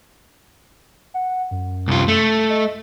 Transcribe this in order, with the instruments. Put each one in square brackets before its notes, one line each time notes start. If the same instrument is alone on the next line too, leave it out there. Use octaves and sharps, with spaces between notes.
[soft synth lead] F#5
F#2
[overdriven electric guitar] C2 F4
A3
[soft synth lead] D#5